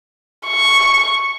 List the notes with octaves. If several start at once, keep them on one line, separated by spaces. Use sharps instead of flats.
C#6